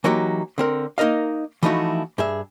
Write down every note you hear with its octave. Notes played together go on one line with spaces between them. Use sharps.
E3 F#3 A#3 D#4 F#4 G4
D3 C4 A#4
A#3 D#4 A#4 D#5 F5
E3 F3 A3 D#4 E4 F#4
G2 G#4 E5